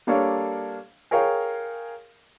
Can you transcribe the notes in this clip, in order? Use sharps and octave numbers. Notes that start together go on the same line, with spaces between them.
G3 A#3 D4 A4 C#5 F5
G#4 A#4 C#5 F5 G5